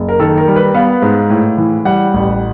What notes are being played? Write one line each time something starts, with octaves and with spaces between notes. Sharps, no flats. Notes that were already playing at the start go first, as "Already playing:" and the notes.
Already playing: F#1
A#4
D#3 A4
A#4
G3
B4
B3 F5
G#2
A2
E3
G3 F#5
A1